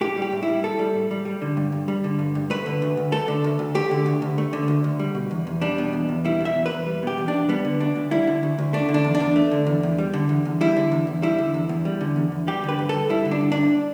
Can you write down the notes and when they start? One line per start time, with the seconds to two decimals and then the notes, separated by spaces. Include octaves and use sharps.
0.01 A2 G4
0.17 G3 G4
0.32 A2
0.43 E4
0.48 G3
0.63 A2 A4
0.79 G3
0.95 A2
1.11 G3
1.25 G3
1.42 D3
1.57 G2
1.72 G2
1.88 G3
2.04 D3
2.19 G2
2.35 G2
2.50 A3 B4
2.66 D3
2.82 D2
2.97 D2
3.12 A3 A4
3.28 D3
3.44 D2
3.59 D2
3.75 A3 G4
3.91 D3
4.06 D2
4.22 D2
4.38 A3
4.53 D3
4.68 D2
4.84 D2
4.99 G3
5.15 B2
5.31 E2
5.47 E2
5.61 G3 D4
5.78 B2
5.93 E2
6.09 E2
6.25 G3 E4
6.41 B2 E5
6.56 E2
6.66 B4
6.71 E2
6.87 G3
7.03 B2 G4
7.18 E2
7.28 D4
7.34 E2
7.49 G3 B3
7.65 D3
7.80 D2 D4
7.96 D2
8.11 G3 E4
8.27 D3
8.43 D2
8.58 D2
8.73 A3 D4
8.89 D3
8.94 D4
9.04 E2
9.15 D4
9.20 E2
9.36 A3
9.51 D3
9.67 E2
9.83 E2
9.98 G3
10.14 D3
10.29 E2
10.45 E2
10.61 G3 E4
10.76 D3
10.92 E2
11.07 E2
11.22 G3 E4
11.38 D3
11.54 E2
11.69 E2
11.85 G3
12.01 D3
12.16 E2
12.32 E2
12.47 G3 G4
12.64 D3
12.69 B4
12.79 G2
12.89 G2 A4
13.09 G3 E4
13.25 D3
13.31 D4
13.41 G2
13.52 D4
13.57 G2